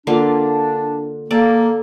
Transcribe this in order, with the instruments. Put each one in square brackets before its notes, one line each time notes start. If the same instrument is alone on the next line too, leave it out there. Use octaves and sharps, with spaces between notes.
[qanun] D3 A#3 F4 [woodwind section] D4
[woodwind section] A#3 [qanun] A4 D5